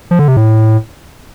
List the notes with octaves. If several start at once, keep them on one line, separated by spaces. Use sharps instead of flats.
F3
D3
C3
A2